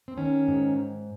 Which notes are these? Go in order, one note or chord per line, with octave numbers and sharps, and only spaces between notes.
C4
D#3 C#4
G#2